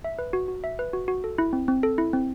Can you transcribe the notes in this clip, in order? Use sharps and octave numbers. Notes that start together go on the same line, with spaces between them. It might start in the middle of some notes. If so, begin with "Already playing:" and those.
E5
B4
F#4
F#4
E5
B4
F#4
F#4
A4
E4
C4
C4
A4
E4
C4